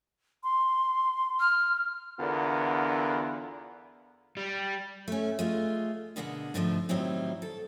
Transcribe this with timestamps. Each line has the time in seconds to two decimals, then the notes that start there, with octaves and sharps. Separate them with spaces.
0.44 C6
1.40 F6
2.19 E2 D3 B3 F4 A#4
4.37 G3
5.08 A3 C#4
5.39 G#3 A3 F4
6.16 B2 D3 G#3 A#3 A#4 F#5
6.54 G#2 B2 D3 F3 G#3 A3
6.89 A2 D#3 F#3 G3 C4 E4
7.42 A4